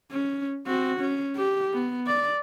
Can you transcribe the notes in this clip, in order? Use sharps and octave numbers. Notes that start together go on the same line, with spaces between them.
C#4
C4 F#4
C#4
G4
B3
D5